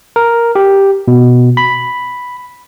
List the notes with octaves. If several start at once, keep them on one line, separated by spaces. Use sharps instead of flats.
A#4
G4
B2
B5